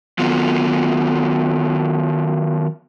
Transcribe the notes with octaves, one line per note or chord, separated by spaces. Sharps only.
D#3 F#3 B3 F4